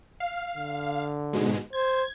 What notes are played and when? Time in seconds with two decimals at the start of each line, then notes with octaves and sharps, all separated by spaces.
0.20 F5
0.57 D3
1.33 G#2 B2 G#3
1.73 C5 G#6